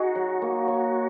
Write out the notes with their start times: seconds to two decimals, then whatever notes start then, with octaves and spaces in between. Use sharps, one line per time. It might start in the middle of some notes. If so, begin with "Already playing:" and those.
Already playing: D#4 F#4 G#4
0.15 F#3
0.42 A#3
0.68 C#5